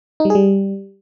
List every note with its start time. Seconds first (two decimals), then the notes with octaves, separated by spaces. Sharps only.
0.20 D#4
0.25 G3
0.30 G#4
0.35 G3